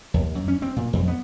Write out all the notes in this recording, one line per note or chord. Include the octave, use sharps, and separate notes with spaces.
D#2
F#2
C#4
C4
A#2
F2
B3